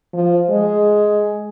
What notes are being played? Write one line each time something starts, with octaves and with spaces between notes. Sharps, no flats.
F3
G#3